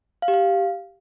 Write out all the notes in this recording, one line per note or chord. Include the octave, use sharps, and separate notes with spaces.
F5
G4
F5